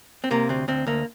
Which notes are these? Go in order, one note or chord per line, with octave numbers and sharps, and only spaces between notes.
C4
C3 A#3
D2 C4
D2 C4
D2 A#3